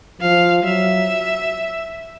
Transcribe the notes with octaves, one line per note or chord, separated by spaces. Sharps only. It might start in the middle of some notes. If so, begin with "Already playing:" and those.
F3 F5
F#3 E5